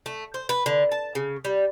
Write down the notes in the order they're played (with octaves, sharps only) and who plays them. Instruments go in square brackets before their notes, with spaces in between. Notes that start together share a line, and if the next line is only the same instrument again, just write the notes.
[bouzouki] A3
C5
B4
D3
A5
C#3
G3